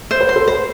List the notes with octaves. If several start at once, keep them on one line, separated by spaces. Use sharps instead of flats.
C5
B4
C6
A4
B4 C5